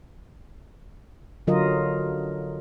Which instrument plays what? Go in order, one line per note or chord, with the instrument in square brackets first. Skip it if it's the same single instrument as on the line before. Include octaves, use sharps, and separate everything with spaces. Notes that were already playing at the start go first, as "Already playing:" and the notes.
[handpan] D3 F#3 F4 A#4 D#5